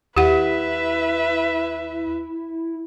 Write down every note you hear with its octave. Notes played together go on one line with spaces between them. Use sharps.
D#2 E4 G4 B4 E5 F#5